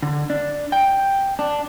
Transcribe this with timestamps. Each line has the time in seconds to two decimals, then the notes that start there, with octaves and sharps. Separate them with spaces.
0.03 D3
0.30 D4
0.72 G5
1.39 D4